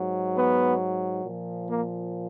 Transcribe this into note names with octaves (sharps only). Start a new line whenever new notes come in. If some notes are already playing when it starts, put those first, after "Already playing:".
Already playing: G#2 F#3
B3
A#2 F3
A#3